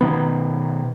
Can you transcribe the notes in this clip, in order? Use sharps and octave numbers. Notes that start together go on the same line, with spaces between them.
B2 D#3 B3